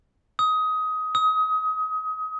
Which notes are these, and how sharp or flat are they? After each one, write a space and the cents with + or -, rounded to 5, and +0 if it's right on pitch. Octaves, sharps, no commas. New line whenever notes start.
D#6 +20
D#6 +30